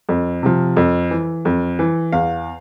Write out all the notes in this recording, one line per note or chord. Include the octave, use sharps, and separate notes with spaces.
F2
C3 F3
F2
E3
F2
E3
E2 F5